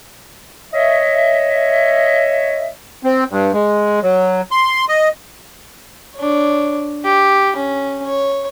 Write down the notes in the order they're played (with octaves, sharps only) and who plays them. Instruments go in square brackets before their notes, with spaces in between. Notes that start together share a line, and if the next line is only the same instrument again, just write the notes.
[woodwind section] C#5 D#5 E5
[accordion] C4
G2
G#3
F#3
C6
D#5
[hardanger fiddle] D4 C#5
G4
C#4
C#5